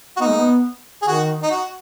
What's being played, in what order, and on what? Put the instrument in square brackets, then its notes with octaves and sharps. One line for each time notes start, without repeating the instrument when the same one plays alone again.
[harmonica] F#4
[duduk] B3 [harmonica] D#4
[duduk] G#3
B3
[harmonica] G#4
[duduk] D#3 [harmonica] F#4
[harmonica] D#4
F#4